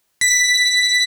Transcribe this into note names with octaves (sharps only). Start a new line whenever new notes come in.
B6